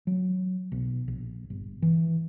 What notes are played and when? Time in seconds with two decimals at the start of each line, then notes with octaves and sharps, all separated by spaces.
0.07 F#3
0.72 B1
1.08 A#1
1.50 G1
1.82 E3